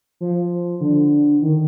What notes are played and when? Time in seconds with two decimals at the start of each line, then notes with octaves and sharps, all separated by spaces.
0.21 F3
0.81 D3
1.42 D#3